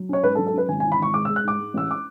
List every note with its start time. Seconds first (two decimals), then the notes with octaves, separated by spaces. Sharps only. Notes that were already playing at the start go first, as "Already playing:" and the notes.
Already playing: F#3
0.09 C#4 C#5
0.23 G#2 B4
0.35 A4
0.39 F#3
0.47 A4
0.54 C#4 B4
0.68 G#1 G#5
0.80 G#5
0.84 E3
0.92 B5
0.99 G#1 C#6
1.14 G#3 D6
1.25 E6
1.28 G#3
1.36 F#6
1.44 G#2 D6
1.59 G#3
1.74 A1 E6
1.91 D6